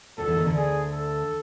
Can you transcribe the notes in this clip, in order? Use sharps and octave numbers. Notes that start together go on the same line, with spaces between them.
D2 D3 A4
F3
E2 E3
D#2 D#3
D2 D3
G#4
A4